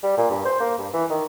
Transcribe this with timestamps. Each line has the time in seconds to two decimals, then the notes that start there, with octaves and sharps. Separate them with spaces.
0.03 G3
0.17 A#2
0.30 G2
0.45 C5
0.60 A#3
0.78 G2
0.93 E3
1.10 D#3